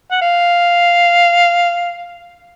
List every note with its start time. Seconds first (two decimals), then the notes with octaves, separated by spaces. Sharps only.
0.11 F#5
0.22 F5